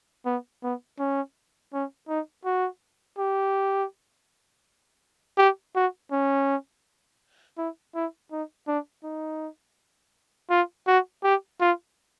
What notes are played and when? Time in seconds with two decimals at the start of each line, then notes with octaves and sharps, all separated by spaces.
0.26 B3
0.63 B3
0.99 C#4
1.73 C#4
2.09 D#4
2.45 F#4
3.18 G4
5.38 G4
5.75 F#4
6.12 C#4
7.58 E4
7.95 E4
8.32 D#4
8.67 D4
9.03 D#4
10.50 F4
10.87 F#4
11.24 G4
11.60 F4